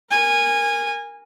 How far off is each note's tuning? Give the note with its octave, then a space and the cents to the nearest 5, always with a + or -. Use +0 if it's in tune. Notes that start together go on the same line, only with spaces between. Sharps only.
A#4 +0 G#5 -20